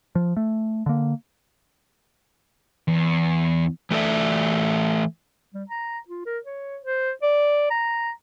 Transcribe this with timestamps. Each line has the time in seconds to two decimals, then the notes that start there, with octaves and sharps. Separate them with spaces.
0.15 F3
0.37 A3
0.86 D3 A#3
2.88 E2
3.91 E3 A3 A4 D5 E5
5.54 G3
5.70 A#5
6.08 F4
6.26 A#4
6.45 C#5
6.82 C5
7.22 D5
7.70 A#5